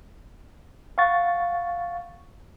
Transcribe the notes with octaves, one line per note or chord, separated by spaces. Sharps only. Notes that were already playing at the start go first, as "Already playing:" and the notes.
F5 F#5 C#6 A6